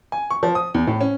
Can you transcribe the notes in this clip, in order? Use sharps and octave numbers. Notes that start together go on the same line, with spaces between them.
G#5
C#6
F3
D#6
E2
A2
C#4